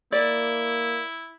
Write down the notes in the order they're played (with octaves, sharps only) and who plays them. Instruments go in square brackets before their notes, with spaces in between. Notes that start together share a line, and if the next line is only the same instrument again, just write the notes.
[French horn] A#3 [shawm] E4 [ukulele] D5